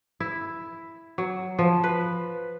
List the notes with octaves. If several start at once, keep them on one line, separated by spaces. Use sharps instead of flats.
E4
F#3
F3
B4